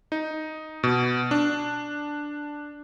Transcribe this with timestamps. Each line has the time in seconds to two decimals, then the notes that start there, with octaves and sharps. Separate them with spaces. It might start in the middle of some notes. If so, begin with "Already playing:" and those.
0.12 D#4
0.83 B2
1.31 D4